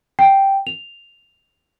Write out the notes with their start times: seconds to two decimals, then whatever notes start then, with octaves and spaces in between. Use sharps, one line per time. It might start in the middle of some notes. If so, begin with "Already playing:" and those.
0.19 G5
0.67 F7